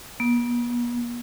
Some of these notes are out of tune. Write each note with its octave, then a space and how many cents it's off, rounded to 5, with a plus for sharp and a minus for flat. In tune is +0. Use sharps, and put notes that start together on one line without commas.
B3 -45